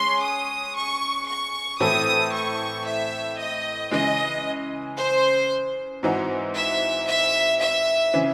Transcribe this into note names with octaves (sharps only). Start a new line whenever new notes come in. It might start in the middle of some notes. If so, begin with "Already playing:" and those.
Already playing: G#3 C#4 G#4 C#5 C6
D#6
C#6
C#6
A2 E3 C4 E4 A4 D#6
C#6
E5
D#5
C#3 E3 G#3 D#5
C5
G#2 E3 C4 D#4 F#4
E5
E5
E5
C#3 E3 C4